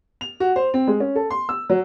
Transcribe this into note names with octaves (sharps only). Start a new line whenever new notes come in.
F7
F#4
C5
C4
G#3
C#4
A4
C6
E6
F#3